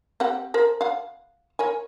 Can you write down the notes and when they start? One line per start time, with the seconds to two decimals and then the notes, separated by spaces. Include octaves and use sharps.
0.20 C4 G4 F#5
0.54 A#4 C5
0.81 F5 F#5
1.59 A#4 C#5 G#5